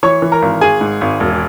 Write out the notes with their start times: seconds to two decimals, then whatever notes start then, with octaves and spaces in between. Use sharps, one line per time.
0.03 E3 C#5 C#6
0.22 E3
0.32 A#4 A#5
0.42 G#1
0.61 G#1 G#4 G#5
0.81 G#2
1.01 G#1
1.20 E1